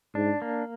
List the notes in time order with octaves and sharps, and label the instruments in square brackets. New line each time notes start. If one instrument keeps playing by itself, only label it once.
[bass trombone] G#2 [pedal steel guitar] D4
[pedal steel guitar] A#3